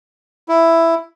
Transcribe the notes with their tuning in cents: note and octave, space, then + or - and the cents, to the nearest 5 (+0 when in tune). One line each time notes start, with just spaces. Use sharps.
E4 +5